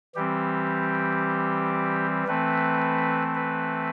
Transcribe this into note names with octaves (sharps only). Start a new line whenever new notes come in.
E3 G3 C4 G4
E3 A3 C4 B4
B4